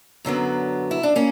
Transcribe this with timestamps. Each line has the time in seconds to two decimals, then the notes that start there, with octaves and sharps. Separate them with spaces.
0.25 F#2 D3 F#3 B3
0.91 E4
1.03 D4
1.16 A#3 C#4